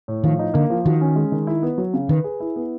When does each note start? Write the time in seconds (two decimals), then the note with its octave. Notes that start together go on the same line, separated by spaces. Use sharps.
0.08 A2
0.24 D#3 F3
0.39 D#4
0.54 D3 A#3
0.70 F3
0.85 D#3 F#4
1.01 C#4
1.16 G#3
1.32 D#3
1.47 E4
1.63 B3
1.78 F#3
1.94 C#3
2.09 D#3 B4
2.24 G#4
2.40 E4
2.56 B3